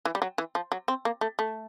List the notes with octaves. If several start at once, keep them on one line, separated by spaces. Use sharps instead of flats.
E3
G3
F#3
E3
F3
F#3
C4
A#3
A3
A3